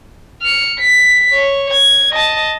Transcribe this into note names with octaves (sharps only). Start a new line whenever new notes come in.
F6 C#7
B6
C#5
G#6
D#5 A5